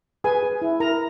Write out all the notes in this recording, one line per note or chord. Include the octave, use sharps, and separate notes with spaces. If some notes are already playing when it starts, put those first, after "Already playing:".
G#4 B4 G#5
G#4
E4
E4 A#4 A#5